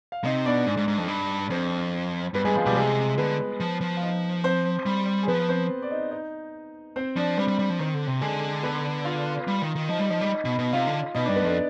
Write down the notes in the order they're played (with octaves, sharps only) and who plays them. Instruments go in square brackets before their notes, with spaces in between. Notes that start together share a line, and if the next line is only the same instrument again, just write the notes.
[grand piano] F5
[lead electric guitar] C3 [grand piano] D#4 D#5
[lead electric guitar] B2 [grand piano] D4 D5
[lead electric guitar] G#2
G#2
G#2
F2
G2
[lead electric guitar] F2 [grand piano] C4 C5
[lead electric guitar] G2 [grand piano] B3 B4
[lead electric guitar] G2 [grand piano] G#3 G#4
[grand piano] F3 F4
[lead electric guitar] B2 [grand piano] G3 G4
[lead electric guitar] C3 [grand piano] G#3 G#4
[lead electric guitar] D3 [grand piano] B3 B4
[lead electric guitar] F3
F3
[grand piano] F5
D#4 D#5
C4 C5
[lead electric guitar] G3
[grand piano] G#4
[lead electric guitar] F3 [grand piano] B3 B4
[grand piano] C4 C5
D5
D#4 D#5
D#4 D#5
C4 C5
[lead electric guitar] F3 [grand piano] D4 D5
[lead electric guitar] G3 [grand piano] C4 C5
[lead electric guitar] G3
G3
F3
[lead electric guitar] D#3 [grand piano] C4 C5
[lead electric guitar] D3
C3
[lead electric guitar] D3 [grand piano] G#3 G#4
[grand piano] B3 B4
F4 F5
[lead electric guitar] G3
D#3
D#3
[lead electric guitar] F3 [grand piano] D#4 D#5
[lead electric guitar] G3
[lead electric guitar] F3 [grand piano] D#4 D#5
[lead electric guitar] G3
B2
B2
[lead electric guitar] C3 [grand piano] F4 F5
[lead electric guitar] D3
[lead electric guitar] B2 [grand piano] D#4 D#5
[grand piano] D4 D5
[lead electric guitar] G2
[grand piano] B3 B4
[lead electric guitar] F2 [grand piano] D4 D5